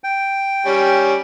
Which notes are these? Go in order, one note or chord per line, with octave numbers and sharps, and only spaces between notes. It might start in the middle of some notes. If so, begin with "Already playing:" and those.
G5
G3 C#4